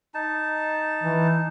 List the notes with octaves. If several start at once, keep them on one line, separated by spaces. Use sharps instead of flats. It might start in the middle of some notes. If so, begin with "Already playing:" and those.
D#4 A5
E3